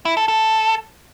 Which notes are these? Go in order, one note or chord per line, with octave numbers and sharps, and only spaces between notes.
E4
A4
A4